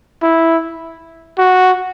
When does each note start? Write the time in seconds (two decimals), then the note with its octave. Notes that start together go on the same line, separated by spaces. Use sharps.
0.23 E4
1.38 F#4